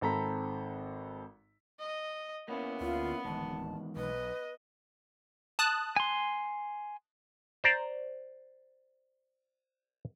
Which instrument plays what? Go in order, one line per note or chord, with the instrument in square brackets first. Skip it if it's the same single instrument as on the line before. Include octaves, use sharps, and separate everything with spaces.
[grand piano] G#1 C4 A4 A#5 B5 B6
[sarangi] D#5
[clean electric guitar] A#3 C#4 E4 [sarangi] B3
[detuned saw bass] D2 [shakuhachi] F4
[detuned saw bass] D1 [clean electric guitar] E2 G#2 D#3 [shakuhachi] A5
[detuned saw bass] B1 [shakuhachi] B4 [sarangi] D#5
[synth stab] A5 D#6 F#6
[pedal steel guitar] G#5 C6
[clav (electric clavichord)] C5 D5 A#5